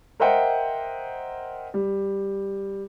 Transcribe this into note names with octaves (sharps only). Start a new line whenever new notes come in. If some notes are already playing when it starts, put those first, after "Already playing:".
A#4 C5 D#5 E5 F#5 G5
G3